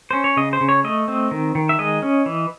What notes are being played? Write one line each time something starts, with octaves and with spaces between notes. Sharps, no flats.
C#4 C5
C#5
C#3 D#5
C5
C#3
C#5
A3 D#5
C4
D#3
D#3
E5
G#3 D#5
C#4
E3